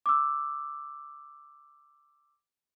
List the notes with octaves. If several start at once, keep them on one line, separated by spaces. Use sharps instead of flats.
D6 E6